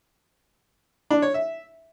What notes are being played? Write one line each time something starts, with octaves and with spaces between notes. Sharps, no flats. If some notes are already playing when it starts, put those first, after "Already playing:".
D4
C#5
E5